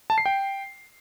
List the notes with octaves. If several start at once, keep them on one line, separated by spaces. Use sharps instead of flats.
A5
C7
G5